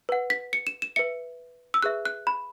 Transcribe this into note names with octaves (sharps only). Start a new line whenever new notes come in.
B4 F#5
B6
C#7
E7
E7
B4 E5 C#7
E6
G#4 B4 E5 F#6
F#6
B5